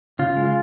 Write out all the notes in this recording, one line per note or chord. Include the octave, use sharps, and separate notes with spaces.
C#3 F4
G#3
F4